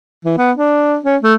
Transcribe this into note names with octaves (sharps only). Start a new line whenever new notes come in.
E3
B3
D4
C#4
A3